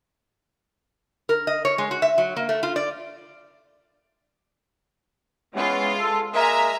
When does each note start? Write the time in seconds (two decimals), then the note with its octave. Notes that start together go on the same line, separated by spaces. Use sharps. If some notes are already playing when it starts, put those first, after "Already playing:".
1.29 A#4
1.47 D#5
1.65 C#5
1.78 G#3
1.91 F#4
2.02 E5
2.18 F#3
2.37 A#3
2.49 A3
2.63 F4
2.76 D5
5.54 E3 G#3 B3 C#4 F4
5.99 A4
6.33 G#3 A#3 A#4 E5 G#5 A#5